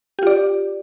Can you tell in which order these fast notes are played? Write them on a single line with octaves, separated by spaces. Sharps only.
G4 F4 D5